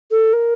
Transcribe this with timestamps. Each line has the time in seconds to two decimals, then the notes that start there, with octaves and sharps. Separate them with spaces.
0.11 A4
0.33 A#4